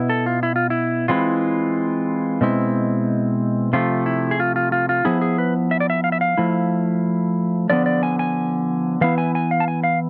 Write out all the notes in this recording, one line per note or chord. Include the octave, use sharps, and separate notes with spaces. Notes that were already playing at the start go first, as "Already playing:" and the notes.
Already playing: B2 B3 E4
A4
F4
E4
F4
E4
E3 G#3 C4 E4 F4
B2 G#3 C4 E4
C3 F3 A3 F4
E4
G#4
F4
F4
F4
F4
F3 B3 E4 G#4
G#4
B4
E5
D5
E5
F5
E5
F5
F3 A3 E4
D3 F3 B3 D5
D5
G#5
G#5
E3 B3 E4 F5
G#5
G#5
F5
A5
G#5
F5